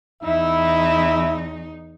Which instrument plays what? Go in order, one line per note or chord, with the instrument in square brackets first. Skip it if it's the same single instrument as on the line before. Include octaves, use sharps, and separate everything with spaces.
[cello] E2 D#4 [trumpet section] E4 E5